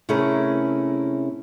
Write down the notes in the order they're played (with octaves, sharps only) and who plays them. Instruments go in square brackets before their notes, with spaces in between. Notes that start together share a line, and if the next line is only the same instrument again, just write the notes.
[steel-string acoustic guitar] C3 A3 C#4 E4 G#4 A#4